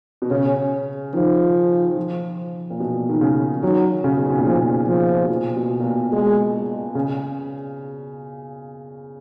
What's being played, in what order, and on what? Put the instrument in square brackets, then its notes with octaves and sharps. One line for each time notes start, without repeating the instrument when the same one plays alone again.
[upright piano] B2
[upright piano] C#3 [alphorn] C#4
[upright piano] D#3 [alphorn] F3
[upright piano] F3
A#2
B2
D#3
C#3
[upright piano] D#3 [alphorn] F#3
[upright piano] C#3
B2
C#3
A#2
[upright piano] B2 [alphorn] F3
[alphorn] F3
[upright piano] B2
A#2
B2
A#2
B2
[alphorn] G#3
[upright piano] C#3